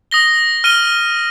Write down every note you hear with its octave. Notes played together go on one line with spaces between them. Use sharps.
D#6 A#6 G7
F6 D#7 G7